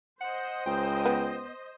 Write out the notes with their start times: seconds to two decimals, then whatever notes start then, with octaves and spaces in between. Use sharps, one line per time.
0.21 C5 D#5 F#5
0.66 C#2 G5
1.06 B3